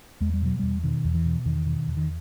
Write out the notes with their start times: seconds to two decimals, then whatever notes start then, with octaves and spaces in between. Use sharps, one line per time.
0.20 E2 G#3
0.34 G3
0.42 B2 F#3
0.59 E2 G3
0.84 B2 D#3
1.04 E2
1.15 E3
1.25 B2
1.45 E2 D#3
1.66 B2
1.88 E2
1.97 D#3